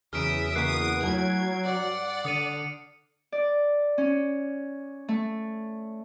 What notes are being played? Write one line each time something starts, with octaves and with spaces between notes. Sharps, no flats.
E2 C#3 F#3 G#4 E5 D#6 F6 D7
C#3 A#3 F#4 D#6 F#6 C7
F#3 A3 E4 G#5 G#6
G2 D5 F#5
D3 D#6 C#7 D#7
D5
C#4
A3